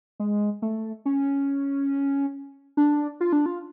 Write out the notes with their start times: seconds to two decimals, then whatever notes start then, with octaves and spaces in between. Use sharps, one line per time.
0.20 G#3
0.62 A3
1.06 C#4
2.77 D4
3.21 F4
3.33 D4
3.46 F4